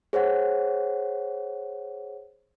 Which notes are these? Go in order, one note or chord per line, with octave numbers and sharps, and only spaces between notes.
G#4 C5 C#5 F#5